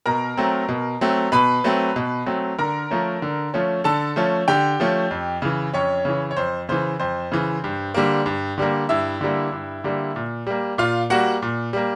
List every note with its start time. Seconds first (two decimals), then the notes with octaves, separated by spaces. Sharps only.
0.06 B2 A#4 A#5
0.37 F#3 A3 C4
0.69 B2
1.01 F#3 A3 C4
1.32 B2 B4 B5
1.64 F#3 A3 C4
1.96 B2
2.26 F#3 A3 C4
2.59 D3 A#4 A#5
2.91 F3 A3 C#4
3.22 D3
3.54 F3 A3 C#4
3.84 D3 A4 A5
4.16 F3 A3 C#4
4.48 D3 G4 G5
4.80 F3 A3 C#4
5.11 F2
5.42 C#3 E3
5.73 F2 C#4 C#5
6.05 C#3 E3
6.31 C#5
6.37 F2 C5
6.69 C#3 E3 C5
7.00 F2 C5
7.32 C#3 E3
7.64 G2
7.94 D3 G3 A#3
8.26 G2
8.58 D3 G3 A#3
8.89 G2 E4 E5
9.21 D3 G3 A#3
9.52 G2
9.84 D3 G3 A#3
10.16 A#2
10.47 G3 A#3
10.78 A#2 F4 F5
11.10 G3 A#3 F#4 F#5
11.42 A#2
11.73 G3 A#3